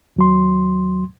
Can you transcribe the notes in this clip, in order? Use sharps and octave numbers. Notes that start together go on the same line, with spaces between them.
D#2 F#3 C6